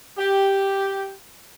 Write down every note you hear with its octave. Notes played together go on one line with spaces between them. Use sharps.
G4